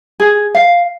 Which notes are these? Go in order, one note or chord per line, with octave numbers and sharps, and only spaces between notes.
G#4
F5